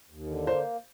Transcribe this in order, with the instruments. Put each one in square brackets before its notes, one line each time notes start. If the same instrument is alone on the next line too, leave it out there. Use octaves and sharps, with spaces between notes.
[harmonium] D#2
D3
A#3
[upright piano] C5